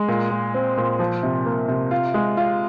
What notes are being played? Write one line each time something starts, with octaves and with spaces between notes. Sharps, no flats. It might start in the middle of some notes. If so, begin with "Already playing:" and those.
Already playing: G#3
A#2
A#2
C4
A#2
F3
C3
A#3
C3
F4
G#3
F4